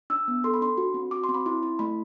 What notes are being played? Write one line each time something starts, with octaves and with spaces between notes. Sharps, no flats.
D4 E6
B3
A4 C6
B5
D4 C6
F#4
C4
F#4 D6
C6
C4
B5
E4 C6
E4
A3 B5